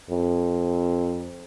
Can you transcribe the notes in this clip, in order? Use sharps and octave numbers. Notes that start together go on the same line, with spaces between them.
F2